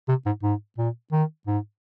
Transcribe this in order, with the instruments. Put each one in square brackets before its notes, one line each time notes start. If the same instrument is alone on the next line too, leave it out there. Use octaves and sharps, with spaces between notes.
[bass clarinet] C3
G#2
G#2
A#2
D#3
G#2